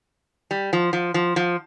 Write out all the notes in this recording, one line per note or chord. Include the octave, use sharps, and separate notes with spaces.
G3
F3
F3
F3
F3